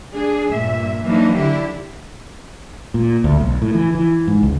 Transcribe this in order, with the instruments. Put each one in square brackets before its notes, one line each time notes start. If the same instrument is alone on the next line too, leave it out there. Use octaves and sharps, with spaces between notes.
[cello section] D4 G#4
G2 A#2 E5
E3 F#3 A#3 D4 D#4
D3 D4 E4 G4
[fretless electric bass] A#2
D2
B1
A2
E3
E3
G#2
C#2